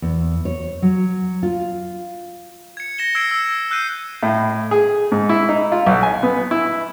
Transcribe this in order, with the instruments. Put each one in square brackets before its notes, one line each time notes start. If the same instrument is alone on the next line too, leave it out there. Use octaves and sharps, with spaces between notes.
[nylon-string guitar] E2
C#5
F#3
F4
[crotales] G#6 C#7
A#6 C#7 E7 G7
E6 G#6 A#6 C7 D7
E6 G#6
E6 F#6 G6 C7 D#7
[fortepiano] A2
G#4
G#2
E4
D#4
F4
B1
G#5
B3
E4